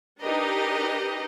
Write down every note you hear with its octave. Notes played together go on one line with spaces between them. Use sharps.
D4 D#4 G4 A#4 B4 D#5